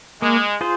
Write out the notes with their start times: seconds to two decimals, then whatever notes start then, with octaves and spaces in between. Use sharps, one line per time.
0.22 G#3 A#3
0.61 F4 G#4 C5